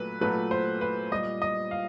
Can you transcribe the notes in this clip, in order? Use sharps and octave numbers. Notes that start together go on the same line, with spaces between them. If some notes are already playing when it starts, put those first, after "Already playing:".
Already playing: A#2 F#3 A3 B4
A#2 F#3 A3 B4
C5
B4
A#2 G3 D#5
D#5
F5